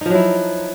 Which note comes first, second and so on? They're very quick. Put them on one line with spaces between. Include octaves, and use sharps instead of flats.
D#4 F3 F#3 E4